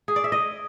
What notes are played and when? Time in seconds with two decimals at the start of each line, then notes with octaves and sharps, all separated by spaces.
0.08 G#4
0.16 D5
0.24 E5
0.32 D#5